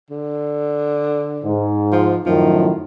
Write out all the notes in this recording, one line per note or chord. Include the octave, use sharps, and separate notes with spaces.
D3
G#2
F3
F#2 A2 D#3 F3